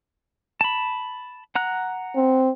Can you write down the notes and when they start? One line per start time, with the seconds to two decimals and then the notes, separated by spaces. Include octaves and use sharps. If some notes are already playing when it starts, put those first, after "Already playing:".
0.61 A5 B5
1.55 F#5 A#5 F#6
2.16 C4